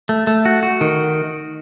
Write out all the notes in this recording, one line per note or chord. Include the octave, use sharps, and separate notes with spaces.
A3
A3
F#4
F#4
D#3